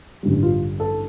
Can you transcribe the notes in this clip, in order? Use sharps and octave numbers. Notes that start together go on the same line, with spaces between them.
A1 G2 D3 G3
F4
A4